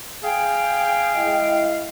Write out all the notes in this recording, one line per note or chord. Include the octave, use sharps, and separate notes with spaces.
G#4 F5 G5
G#3 E4 D#5